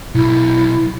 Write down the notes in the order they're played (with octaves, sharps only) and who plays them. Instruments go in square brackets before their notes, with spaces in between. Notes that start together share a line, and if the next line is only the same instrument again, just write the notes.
[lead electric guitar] B1 [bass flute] E4